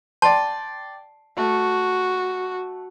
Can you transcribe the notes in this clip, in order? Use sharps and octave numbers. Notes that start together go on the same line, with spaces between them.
D5 G5 A5 C6
A3 F#4